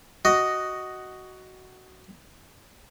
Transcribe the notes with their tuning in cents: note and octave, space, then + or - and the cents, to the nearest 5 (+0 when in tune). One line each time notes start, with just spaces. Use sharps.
F#4 +10 D#5 +0